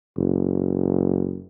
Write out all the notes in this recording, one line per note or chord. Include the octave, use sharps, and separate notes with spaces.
F#1